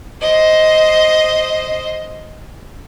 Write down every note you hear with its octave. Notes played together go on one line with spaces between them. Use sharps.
C5 D#5